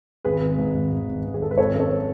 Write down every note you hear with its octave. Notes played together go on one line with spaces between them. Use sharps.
G#1 G#4 B4
G#1
G#2
G#1
G#1
G#1
G#1
G#4
G#2 A4
B4
G#1 A4 C#5
F#2
A4 C#5